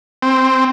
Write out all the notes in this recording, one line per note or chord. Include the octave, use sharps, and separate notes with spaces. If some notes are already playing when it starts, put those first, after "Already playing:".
C4